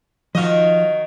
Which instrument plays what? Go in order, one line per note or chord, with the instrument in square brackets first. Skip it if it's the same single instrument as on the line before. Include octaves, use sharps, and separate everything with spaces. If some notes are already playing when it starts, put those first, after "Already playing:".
[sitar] D#3 F#4 D#5 [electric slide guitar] F3 F5